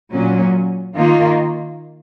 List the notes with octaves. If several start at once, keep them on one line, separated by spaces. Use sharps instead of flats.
A#2 F#3 C#4
D#3 A#3 F4